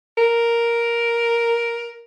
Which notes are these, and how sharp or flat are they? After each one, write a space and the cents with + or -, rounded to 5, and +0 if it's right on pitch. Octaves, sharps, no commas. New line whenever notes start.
A#4 +5